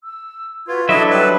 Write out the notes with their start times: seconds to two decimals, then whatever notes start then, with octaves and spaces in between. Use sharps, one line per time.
0.05 E6
0.68 F4 F#4 B4 G#6
0.89 F#3 D4 E4 A4 D#5 E5
1.10 G3 B4